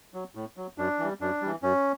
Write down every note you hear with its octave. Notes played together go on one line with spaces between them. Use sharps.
F#3
A2
F#3
F#2 D4
E3 G3
F#2 D4
E3 G3
F#2 C#4